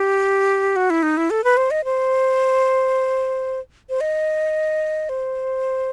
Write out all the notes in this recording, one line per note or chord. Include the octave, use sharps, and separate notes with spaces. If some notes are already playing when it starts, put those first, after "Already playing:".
Already playing: G4
F#4
E4
D#4
E4
A4
B4
C5
D#5
C5
C5
D#5
C5